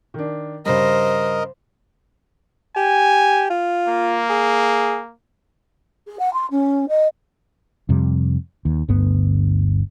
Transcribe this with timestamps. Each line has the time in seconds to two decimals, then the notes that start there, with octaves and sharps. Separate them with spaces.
0.14 D#3 D4
0.66 G2 C#3 A#4 C5 D#5
2.76 G4 G#5
3.50 F4
3.88 A#3
4.30 G#4
6.07 G#4
6.19 F#5
6.33 C6
6.51 C#4
6.89 D#5
7.89 F2 C3 G3
8.65 D#2
8.89 G1 D2 G2 B3